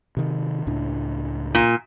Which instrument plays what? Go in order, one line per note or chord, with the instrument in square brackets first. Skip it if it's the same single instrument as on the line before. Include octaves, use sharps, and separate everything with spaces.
[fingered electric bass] C3 D#3
C#2 A2 D4
[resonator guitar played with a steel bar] A#2